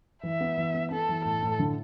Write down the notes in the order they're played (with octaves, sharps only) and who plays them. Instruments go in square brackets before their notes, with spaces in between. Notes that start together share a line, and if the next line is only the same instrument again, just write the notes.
[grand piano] E3 [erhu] E5
[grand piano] B3
E3
B3
[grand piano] B3 [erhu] A4
[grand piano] E3
[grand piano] A2 [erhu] A4
[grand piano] A2
D3